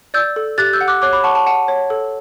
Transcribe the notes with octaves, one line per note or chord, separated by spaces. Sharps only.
D5 E6 G6
A4
G4 F#6 A6
E6 G6
F#5
D6 F#6
C#5 D6 F#6
B5 D6
F#5 A5 C#6
A5 C#6
F#5 A5
C#5
A4